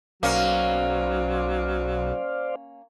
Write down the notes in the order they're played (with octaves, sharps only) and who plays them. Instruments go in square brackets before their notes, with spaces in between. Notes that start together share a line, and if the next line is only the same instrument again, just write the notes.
[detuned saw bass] B1 [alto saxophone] F#3 [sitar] A#3 C#4 [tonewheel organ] C5 D5 F5